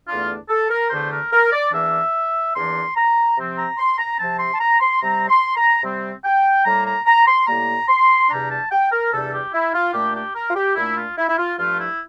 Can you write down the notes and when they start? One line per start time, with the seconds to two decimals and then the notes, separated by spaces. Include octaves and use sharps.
0.08 E2 D3 A3 D4 F4
0.49 A4
0.70 A#4
0.90 E2 D3 A3 D4 C5
1.11 A#4
1.32 A#4
1.52 D5
1.72 E2 E3 A#3 D4 E5
2.55 E2 E3 A#3 D4 C6
2.96 A#5
3.37 C3 F3 C4
3.57 A#5
3.77 C6
3.98 A#5
4.19 C3 F3 C4 A5
4.39 C6
4.53 A5
4.60 A#5
4.80 C6
5.01 C3 G3 C4 A#5
5.29 C6
5.56 A#5
5.83 C3 G3 C4
6.25 G5
6.65 A2 G3 A#3 A#5
6.86 A#5
7.06 A#5
7.27 C6
7.47 A2 G3 A#3 A#5
7.88 C6
8.29 E2 C3 G3 D4 A#5
8.50 A5
8.71 G5
8.91 A#4
9.12 E2 C3 G3 D4 A4
9.32 G4
9.53 E4
9.74 F4
9.93 A#2 A3 D4 G4
10.15 G4
10.35 A#4
10.48 F4
10.55 G4
10.75 A#2 A3 D4 E4
10.97 F4
11.17 E4
11.28 E4
11.38 F4
11.57 G2 F3 A3 F4
11.78 E4